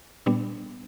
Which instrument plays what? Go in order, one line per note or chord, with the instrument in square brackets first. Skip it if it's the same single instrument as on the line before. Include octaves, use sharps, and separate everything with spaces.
[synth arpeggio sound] A#2 G3 B3 D4